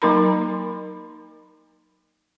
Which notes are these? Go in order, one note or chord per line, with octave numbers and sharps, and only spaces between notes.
F#3 A#3 D#4 A#4 A#5 B5